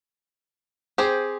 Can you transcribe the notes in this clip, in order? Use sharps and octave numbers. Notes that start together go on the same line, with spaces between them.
C4 G4 G#4 C5